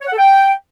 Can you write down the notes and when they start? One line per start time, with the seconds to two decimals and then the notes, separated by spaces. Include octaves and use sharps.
0.02 C#5
0.07 F#5
0.12 A4
0.18 G5